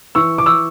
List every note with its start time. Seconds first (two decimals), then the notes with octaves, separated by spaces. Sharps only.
0.15 E3 C#6 E6
0.38 D6
0.46 C#6 E6